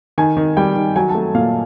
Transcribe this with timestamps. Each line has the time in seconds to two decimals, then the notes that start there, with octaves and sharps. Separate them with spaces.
0.18 D#3 G#5
0.37 D#3
0.57 G3 G5
0.76 D#3
0.96 F#3 G#5
1.09 A5
1.15 A3
1.34 A#2 F5